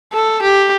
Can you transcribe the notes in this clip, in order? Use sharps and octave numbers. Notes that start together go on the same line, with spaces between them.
A4
G4